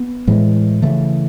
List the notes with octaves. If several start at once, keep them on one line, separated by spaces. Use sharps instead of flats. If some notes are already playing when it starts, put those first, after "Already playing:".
Already playing: B3
A2 E3 G#3
C#3 E3 A3